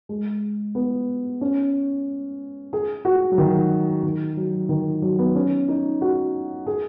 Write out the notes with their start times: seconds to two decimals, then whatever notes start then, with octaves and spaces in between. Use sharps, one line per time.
0.09 G#3
0.75 B3
1.41 C#4
2.73 G#4
3.05 F#4
3.32 F#3
3.38 D#3
4.03 D#3
4.37 F#3
4.69 D#3
5.02 F#3
5.19 B3
5.35 C#4
5.68 D#4
6.01 F#4
6.67 G#4